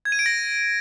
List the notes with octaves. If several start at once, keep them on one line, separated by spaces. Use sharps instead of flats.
G#6
D#7
D7
A#6